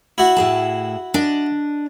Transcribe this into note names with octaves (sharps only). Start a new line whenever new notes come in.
E4 F#4
A2 G#4 A5
D4 D5 D#5